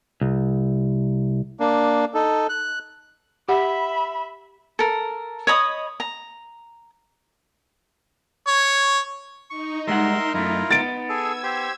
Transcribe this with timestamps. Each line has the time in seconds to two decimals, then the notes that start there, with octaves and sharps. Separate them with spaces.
0.21 C2
1.60 A#3 D4
2.14 D#4 A4
2.49 F#6
3.48 G4 E5 F#5 B5
4.79 A4 A#4
5.47 C#5 D#5 B5 D#6
6.00 A#5
8.47 C#5
9.50 D#4 C#6
9.87 G3 G#3 A#4 E5 F#5 C6
10.34 F#2 A3 E4 F4 A#4
10.71 B3 A6 D7
11.09 G#4 A4 E6 G#6
11.43 G4 C5